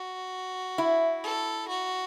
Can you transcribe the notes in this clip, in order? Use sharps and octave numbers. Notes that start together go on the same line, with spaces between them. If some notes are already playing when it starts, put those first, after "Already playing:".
Already playing: F#4
E4
A4
F#4